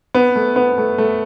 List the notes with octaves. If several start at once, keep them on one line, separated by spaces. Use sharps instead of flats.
B3
A3
B3
A3
A3